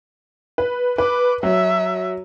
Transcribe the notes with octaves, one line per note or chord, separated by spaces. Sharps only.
B4
B4 D6
F#3 E5